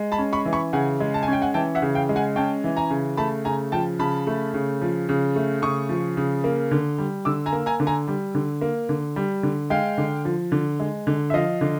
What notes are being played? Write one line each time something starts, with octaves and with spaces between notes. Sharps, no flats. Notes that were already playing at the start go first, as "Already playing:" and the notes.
Already playing: G#3
A5 B5
C#4
B5 C#6
E3
B5 C#6
C#3 F#5 G#5
G#3
A5
G#5
C#4 G5
F#5 G#5
E3 G5 A5
E5 F#5
C#3
F5 G5
G#3
F#5 G#5
C#4 G5 A5
E3
G#5 A#5
C#3
A3 A5 B5
C#3 G#5 A#5
F3 G5 A5
C#3 A5 B5
A3
C#3
F3
C#3
A3
C#3 C#6 D#6
F3
C#3
A#3
D3
G3
D3 D6 E6
G#5 A#5
A#3
G#5 A#5
D3
G#5 A#5
G3
D3
A#3
D3
G3
D3
G#3 F5 G5
D3
F3
D3
G#3
D3
E5
F3 D#5 F5
D3